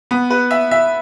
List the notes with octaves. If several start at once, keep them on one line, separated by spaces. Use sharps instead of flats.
B3
B4
E5
E5